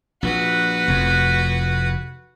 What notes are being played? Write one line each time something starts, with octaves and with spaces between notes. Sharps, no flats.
A#1 F#4 B4
F1 F2